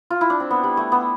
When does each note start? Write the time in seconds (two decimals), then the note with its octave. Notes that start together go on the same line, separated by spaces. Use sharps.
0.10 F4
0.21 E4
0.30 D4
0.40 C4
0.51 B3
0.63 G3
0.77 A3
0.92 B3